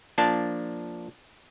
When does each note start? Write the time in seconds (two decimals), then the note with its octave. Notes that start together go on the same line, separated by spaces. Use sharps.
0.18 F3 A#3 D4 A5